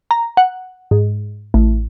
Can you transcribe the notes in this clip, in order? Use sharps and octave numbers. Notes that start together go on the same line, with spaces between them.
A#5
F#5
G#2
A1